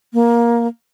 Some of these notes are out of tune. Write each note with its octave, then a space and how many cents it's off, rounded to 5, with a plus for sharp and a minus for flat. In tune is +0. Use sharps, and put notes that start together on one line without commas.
A#3 +15